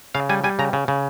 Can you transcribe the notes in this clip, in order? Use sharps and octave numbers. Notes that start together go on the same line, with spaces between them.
C#3 F5
G3 G#5
G3 G#5
C#3 A#5
C#3
C#3